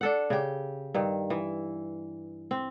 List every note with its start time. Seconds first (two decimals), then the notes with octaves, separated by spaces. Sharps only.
0.01 D4 A4 F#5
0.30 C#3 G4
0.94 G2 D#3
1.30 E3
2.51 C4